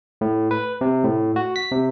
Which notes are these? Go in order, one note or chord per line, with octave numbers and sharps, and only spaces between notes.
A2
B4
C3
A2
F#4
B6
C3